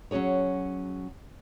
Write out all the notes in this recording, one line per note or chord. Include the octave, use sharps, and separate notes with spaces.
F#3 C#4 F#4 G#4 C#5